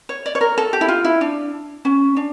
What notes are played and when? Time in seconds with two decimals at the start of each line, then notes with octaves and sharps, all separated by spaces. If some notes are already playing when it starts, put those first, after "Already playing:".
0.09 C#5
0.26 D5
0.35 C#5
0.41 A#4
0.58 A4
0.73 G4
0.81 E4
0.88 F4
1.05 E4
1.21 D4
1.85 C#4
2.16 D4